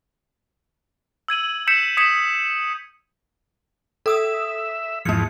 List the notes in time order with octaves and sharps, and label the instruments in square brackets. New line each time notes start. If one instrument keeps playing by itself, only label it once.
[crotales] E6 G#6 D#7 F#7
E6 G6 B6 C#7 E7
D#6 G#6 B6 C#7 E7
[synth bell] A4 D#6 E6 [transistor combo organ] E5
[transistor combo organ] E2 G#2 F3 [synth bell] A#3 C#7